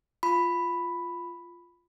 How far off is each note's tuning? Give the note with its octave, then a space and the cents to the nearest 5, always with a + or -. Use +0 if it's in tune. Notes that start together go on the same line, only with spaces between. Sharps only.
F4 +0 B5 +5